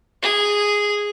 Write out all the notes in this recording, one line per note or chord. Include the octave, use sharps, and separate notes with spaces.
G#4